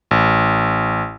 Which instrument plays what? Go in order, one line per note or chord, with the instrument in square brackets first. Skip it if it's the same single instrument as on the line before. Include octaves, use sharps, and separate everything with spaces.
[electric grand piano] A1